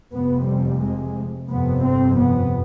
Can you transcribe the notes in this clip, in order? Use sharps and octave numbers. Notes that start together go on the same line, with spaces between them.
F1 F2 C3 B3
G3
G#3
G1 F2 C3 B3
C4
B3